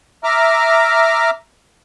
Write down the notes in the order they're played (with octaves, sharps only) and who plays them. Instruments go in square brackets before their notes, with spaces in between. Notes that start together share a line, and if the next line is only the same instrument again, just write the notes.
[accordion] E5 A#5 D6 F6